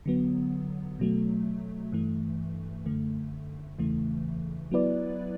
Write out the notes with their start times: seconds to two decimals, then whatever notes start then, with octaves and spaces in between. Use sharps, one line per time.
0.06 D3 F#3 B3
0.99 B2 F#3 A3
1.92 G2 E3 A3
2.86 F#2 D3 A3
3.79 E2 C#3 E3 A3
4.72 F#3 B3 E4 B4 D5